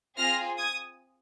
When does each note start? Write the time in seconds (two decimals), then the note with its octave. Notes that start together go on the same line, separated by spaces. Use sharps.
0.17 C4 F4 G#4 F6 A#6
0.57 D#6 G#6